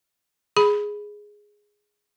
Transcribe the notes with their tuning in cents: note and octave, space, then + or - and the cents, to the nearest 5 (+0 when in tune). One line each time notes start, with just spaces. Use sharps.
G#4 +0 B5 +0